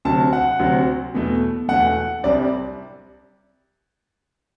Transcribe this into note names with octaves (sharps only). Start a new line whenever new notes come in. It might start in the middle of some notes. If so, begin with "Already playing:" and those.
D2 C3 F#3 A5
F#5
D2 C3 F#3
E2 B2 A3
E2 B2 A3 F#5
C2 C3 G3 D5